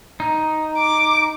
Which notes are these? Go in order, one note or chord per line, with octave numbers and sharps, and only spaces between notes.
D#4
D6